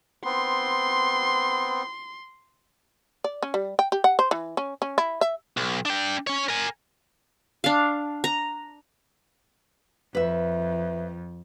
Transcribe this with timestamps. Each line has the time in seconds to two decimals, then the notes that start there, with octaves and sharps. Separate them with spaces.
0.25 B3 C4 C6
3.24 D5
3.43 C#4
3.54 G3
3.79 G5
3.92 G4
4.04 F#5
4.19 C5
4.31 E3
4.57 C#4
4.82 C#4
4.98 E4
5.21 E5
5.57 B1
5.85 D4 G5
6.27 C#4 C#5
6.49 A#4 G#5
7.64 D4 F5
8.24 A#5
10.15 F2 B4 E5